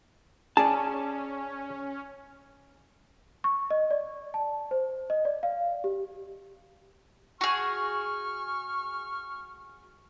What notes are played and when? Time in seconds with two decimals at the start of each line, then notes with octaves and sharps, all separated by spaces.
0.57 C#4 G#4 D5 A5
3.44 C#6
3.71 D#5
3.91 D5
4.34 A5
4.71 C5
5.10 D#5
5.25 D5
5.43 F5
5.84 G4
7.41 F#4 G#4 C#6 F6